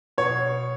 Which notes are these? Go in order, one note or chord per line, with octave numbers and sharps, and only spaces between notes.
B2 C#5